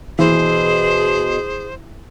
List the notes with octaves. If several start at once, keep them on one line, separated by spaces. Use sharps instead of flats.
B2 E3 G#4 C5